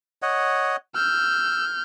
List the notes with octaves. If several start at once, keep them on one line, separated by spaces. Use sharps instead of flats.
C#5 D#5 F#5
E6 F6 G6